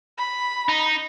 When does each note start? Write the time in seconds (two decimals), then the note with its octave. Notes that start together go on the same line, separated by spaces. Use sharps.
0.18 B5
0.68 D#4